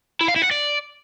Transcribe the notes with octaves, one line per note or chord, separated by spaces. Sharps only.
E4
F5
E4
F#5
D5